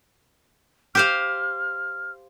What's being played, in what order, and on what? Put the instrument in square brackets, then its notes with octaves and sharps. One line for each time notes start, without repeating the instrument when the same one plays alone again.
[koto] G4 C5 F5 [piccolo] F6